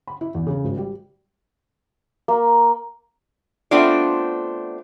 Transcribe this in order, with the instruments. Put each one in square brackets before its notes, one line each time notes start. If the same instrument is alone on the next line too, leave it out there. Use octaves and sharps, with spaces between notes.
[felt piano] B5
E4
E2
C#3
G#1
G3
[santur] A#3
[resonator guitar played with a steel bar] A3 B3 C4 D4 F4 D5